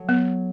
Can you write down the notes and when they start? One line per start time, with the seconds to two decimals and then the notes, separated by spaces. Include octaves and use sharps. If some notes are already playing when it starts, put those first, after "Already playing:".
Already playing: F#3 A3
0.09 B3